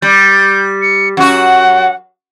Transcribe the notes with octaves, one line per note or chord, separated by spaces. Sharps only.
G3 G6
C#7
F#2 F#4 F#5